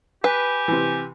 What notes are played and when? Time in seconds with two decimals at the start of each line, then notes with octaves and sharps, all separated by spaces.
0.24 G4 B4 G#5
0.68 C3 E3